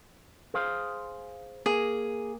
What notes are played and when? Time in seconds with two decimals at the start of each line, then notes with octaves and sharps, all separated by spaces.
0.54 G#4 C5 F5
1.66 A#3 G#4